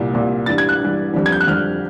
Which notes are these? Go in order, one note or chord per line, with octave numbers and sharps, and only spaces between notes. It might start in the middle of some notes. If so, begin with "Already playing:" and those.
Already playing: C2 A#2 G3
C2 A#2 G3
G2 E3 G3 A6
G#6
F#6
G2 E3 G3
F2 D3 G3
G#6
G6
F#6
F2 D3 G3 F6